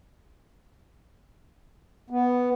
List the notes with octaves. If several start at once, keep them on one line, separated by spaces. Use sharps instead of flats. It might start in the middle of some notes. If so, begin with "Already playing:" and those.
B3